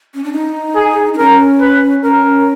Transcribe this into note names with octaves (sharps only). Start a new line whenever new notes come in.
C#4
D4
D#4
G#4
D4
C#4 A#4
B4
C#4 A#4